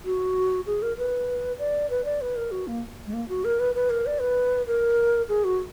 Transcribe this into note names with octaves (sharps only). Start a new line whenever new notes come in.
F#4
G#4
A#4
B4
D5
B4
D5
B4
A#4
F#4
A#3
G#3
A#3
F#4
A#4
B4
B4
A#4
D5
B4
A#4
G#4
F#4